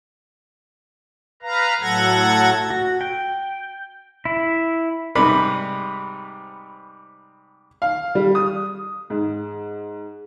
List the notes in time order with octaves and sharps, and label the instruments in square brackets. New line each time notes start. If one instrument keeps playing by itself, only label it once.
[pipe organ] B4 F5 A#5
A2 F#3 A4 F#5 G#6 A#6
[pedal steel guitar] F#4
G5
E4
[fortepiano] G#2 C3 G3 B4 B5
[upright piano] F5
G3
D#6
G#2